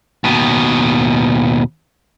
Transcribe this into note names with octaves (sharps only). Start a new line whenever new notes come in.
D#2 B2